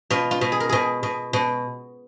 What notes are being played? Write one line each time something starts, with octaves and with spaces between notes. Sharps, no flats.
B2 F4
F4
B2
G#4
A#4
B2 G#4
B2
B2